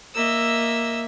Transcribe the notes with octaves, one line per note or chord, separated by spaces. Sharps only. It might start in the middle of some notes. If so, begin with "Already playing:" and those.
A#3 D#5 E5 E6